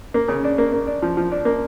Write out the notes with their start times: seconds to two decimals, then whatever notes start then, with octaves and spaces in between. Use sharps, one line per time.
0.14 A#3
0.28 C#3
0.44 D4
0.58 A#3
0.73 A#3
0.87 D4
1.02 F3
1.17 F3
1.32 D4
1.45 A#3